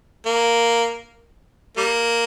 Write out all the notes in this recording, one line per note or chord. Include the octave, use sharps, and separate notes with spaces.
A#3
G3 A#3